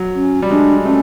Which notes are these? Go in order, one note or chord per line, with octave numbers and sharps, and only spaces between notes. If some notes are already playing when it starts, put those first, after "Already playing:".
Already playing: F#3
C#4
G3
G#3 D4
A3 C#4